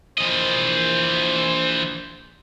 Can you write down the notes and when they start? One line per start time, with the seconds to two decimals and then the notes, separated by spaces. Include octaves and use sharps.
0.18 A#1 E3 C5 D#5